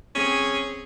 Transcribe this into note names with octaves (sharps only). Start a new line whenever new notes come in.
C4 C#4 G#4